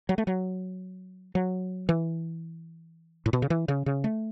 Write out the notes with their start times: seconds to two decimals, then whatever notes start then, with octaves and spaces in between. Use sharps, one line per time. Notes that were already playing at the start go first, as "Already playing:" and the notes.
0.09 F#3
0.18 A3
0.27 F#3
1.35 F#3
1.89 E3
3.26 A2
3.33 B2
3.42 C#3
3.50 E3
3.68 C#3
3.86 C#3
4.04 A3